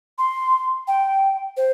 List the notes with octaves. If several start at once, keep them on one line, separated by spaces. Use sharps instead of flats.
C6
G5
C5